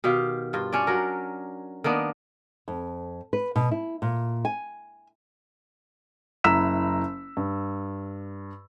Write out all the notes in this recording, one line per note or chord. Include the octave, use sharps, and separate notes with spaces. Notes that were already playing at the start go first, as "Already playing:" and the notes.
B2 D#3 G4 F5
G2 F4
C#4 D4 D5
F#3 A#4
D#3 A#3 B3 D4
F2
B4
B2
E4
A#2
G#5
F#1 E4 A#5 E6 B6 E7
G2